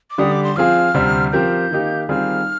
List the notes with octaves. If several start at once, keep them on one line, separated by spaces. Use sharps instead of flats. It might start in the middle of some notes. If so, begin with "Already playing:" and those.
D6
D3 G3 D4 G4 D#6
D6
C6
F3 C4 F4 G#4 F6
D2 C3 G3 C4
F3 C4 G4 A#4 G6
D#3 A#3 D#4 G4
D#3 G3 C4 F4 G#4 F6